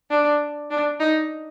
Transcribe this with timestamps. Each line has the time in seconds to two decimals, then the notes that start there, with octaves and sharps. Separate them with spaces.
0.10 D4
0.70 D4
1.00 D#4